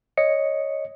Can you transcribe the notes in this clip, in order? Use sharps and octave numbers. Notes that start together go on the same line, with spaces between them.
C#5 D#5 C#7